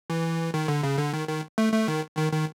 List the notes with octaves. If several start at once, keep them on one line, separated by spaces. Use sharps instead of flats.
E3
D#3
D3
C#3
D3
D#3
D#3
A3
A3
D#3
D#3
D#3